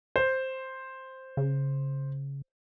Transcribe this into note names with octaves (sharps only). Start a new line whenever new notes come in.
C5
C#3